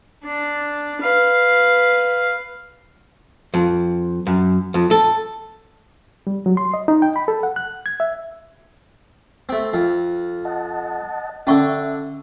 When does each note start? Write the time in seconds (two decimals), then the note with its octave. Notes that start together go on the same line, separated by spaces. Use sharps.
0.24 D4
1.02 B4 F5
3.54 F2
4.27 F#2
4.74 F2
4.91 A4
6.27 G3
6.46 F#3
6.57 C6
6.74 D#5
6.88 D#4
7.02 G5
7.16 B5
7.28 A4
7.43 F#5
7.56 F#6
7.86 G#6
8.00 E5
9.49 A3 C4
9.74 F2
10.45 D#5 F#5 A5
11.47 D3 C#4 D4 E5 C#6